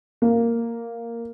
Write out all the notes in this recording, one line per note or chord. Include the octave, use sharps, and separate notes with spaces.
A#3